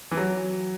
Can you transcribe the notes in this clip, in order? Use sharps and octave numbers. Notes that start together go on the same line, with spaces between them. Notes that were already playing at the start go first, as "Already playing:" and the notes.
E3
F#3